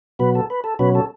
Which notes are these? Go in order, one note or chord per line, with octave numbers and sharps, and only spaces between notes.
B2 F#3 B3 B4
A4
B4
A4
B2 F#3 C#4 B4
A4